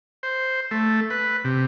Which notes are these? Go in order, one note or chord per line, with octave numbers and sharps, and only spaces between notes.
C5
A3
B4
C3